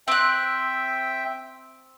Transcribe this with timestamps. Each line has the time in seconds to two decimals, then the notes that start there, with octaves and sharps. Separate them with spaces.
0.08 C4 E5 G5 F#6